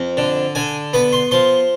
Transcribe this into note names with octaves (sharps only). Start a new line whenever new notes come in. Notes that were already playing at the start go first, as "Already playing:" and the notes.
Already playing: F2
D3
D3 G#5
B3 B5
C6
F3 C6